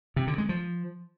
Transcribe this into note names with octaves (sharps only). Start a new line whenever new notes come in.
C3
D3
G#3
F3